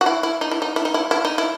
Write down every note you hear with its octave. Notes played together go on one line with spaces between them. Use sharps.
F#4
E4
E4
D#4
E4
D#4
E4
D#4
E4
E4
D#4
E4